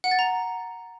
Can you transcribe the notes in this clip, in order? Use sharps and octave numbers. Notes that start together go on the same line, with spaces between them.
F#5
A6
A#5